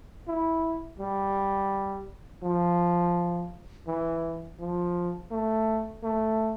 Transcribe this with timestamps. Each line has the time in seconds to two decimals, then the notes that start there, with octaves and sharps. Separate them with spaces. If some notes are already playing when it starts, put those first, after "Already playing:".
0.28 E4
0.99 G3
2.43 F3
3.87 E3
4.60 F3
5.31 A3
6.03 A3